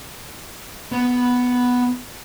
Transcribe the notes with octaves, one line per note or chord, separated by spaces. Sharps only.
B3 B4